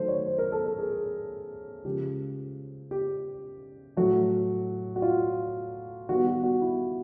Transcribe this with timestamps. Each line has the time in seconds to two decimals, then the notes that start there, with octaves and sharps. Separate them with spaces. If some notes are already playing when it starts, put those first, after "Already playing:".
Already playing: D#3 F#3 A3 C5
0.08 C#5
0.26 C5
0.38 A#4
0.52 A4
0.66 A4
0.78 G#4
1.84 C#3 F3 G#3 G4
2.91 G4
3.97 A2 F#3 A3 F#4
4.96 F#4
5.02 F4
6.09 D#3 G3 B3 F#4
6.27 F#4
6.44 F#4
6.62 E4